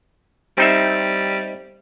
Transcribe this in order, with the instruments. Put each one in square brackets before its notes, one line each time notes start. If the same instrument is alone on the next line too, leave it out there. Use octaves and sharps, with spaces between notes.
[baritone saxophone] G3 [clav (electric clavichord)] C4 D#4 E5